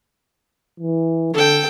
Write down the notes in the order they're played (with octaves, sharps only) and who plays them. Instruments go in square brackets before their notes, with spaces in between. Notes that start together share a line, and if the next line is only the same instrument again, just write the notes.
[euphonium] E3
[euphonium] D3 [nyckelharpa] A4 G5